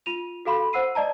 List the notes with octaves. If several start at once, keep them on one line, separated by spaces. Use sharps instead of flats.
F4 D#7 F7
F#4 A4 F5 B5 C6
C5 F#5 E6 C7 D#7
D5 D#5 A5 A#5